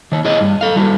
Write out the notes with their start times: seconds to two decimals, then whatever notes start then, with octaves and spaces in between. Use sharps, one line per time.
0.12 D#3 C#5
0.25 E4 G#4 C#5 D#5
0.41 G2
0.61 A4 F5
0.76 G3 E4 F#4